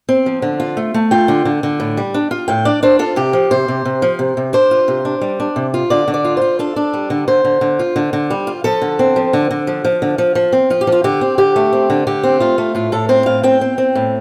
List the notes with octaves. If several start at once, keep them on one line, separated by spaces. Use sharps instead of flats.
C4
F3
D3
F4
A3
A3
F4 G5
D3
D3
D3
A2
G3
D4
F4
A2 G5
D4 D5
D4 C5
F4 A4
C3 G4
F3
C3 C5
C3
C3
F3
C3
C3
D4 C5
F4
C3
D4
G3
D4
C3
F4
D3 D5
D3
D5
F4
F4 C5
D4 A4
D4
G3
D3
D3 C5
D3
D3
F4
D3
D3
G3
F4
F3 A4
D3
C4
F3
D3
D3
F3
F3
D3
F3
F3
C4
F3 F4
G4
F3
F4
D3 G4
C4
D3 G4
A3
C4
D3
D3 G4
C4
A3 F4
A3
A2 F4
A2 A4
C4 C5
A2 F5
C4 G5
C4
C4
A2